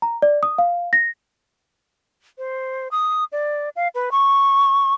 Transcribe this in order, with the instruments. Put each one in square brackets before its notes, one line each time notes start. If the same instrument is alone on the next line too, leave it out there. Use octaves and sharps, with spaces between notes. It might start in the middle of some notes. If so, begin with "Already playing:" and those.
[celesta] A#5
D5
D#6
F5
A#6
[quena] C5
D#6
D5
F5
B4
C#6